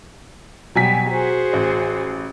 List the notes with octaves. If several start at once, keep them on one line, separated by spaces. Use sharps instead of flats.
B2 F#3 G3 G#5 B6
F#4 G#4 C5
A1